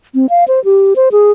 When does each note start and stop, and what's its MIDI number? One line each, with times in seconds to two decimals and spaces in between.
0.15 0.26 60
0.30 0.44 77
0.48 0.63 72
0.65 0.94 67
0.96 1.09 72
1.12 1.32 68